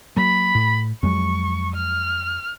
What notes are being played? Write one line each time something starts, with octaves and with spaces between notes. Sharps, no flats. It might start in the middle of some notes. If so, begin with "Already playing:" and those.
F#3 A#3 B5
A2
F2 F#3 G#3 C#6
F6